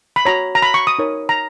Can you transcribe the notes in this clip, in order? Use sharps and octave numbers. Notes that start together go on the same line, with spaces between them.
B5
F#4 C#5 A#5
A#5
B5
C#6
D#6
D#4 A#4 C#5
A#5